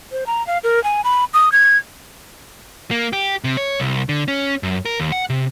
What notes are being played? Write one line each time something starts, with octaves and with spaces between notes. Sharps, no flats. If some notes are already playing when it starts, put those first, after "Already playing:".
C5
A#5
F5
A#4
G#5
B5
D#6
G#6
A#3
G4
C3
C#5
C2
D3
C#4
F#2
A#4
D#2
F#5
C3